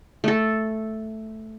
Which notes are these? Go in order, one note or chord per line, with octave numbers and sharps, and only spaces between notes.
A3 A4